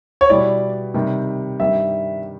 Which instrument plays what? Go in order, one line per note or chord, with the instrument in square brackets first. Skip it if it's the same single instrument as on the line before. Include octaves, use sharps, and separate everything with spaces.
[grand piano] C#5
[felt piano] B2 G3 B3 E4 [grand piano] D5
[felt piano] C3 D#3 G3
[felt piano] G2 D#3 G3 [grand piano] E5